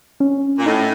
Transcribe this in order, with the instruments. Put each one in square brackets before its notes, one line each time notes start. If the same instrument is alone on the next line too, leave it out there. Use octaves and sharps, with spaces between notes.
[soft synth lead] C#4
[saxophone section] A#2
[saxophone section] A2 [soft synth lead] D#4